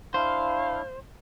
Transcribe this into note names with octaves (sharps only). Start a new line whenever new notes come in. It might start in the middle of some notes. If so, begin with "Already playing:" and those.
D4 E4 C5 F5